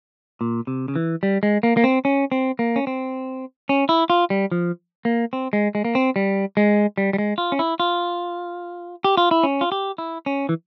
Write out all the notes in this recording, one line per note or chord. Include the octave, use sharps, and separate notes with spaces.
A#2
C3
C#3
E3
G3
G#3
A#3
A#3
C4
C#4
C4
A#3
C#4
C4
C#4
E4
F4
G3
F3
A#3
C4
G#3
G#3
A#3
C4
G3
G#3
G3
G3
G#3
F4
C#4
E4
F4
G4
F4
E4
C#4
F4
G4
E4
C#4
E3